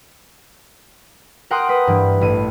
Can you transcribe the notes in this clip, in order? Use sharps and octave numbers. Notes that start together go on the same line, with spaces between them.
A#4 F#5 G5 C6 D#6 F#6
B4 B5 D#6
G2 E3
A1 D#7